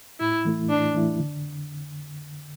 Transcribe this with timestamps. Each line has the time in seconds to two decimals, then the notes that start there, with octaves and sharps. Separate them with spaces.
0.20 A2 E4
0.45 E3 A3 E4
0.69 A2 D4
0.95 E3 A3 E4
1.19 D3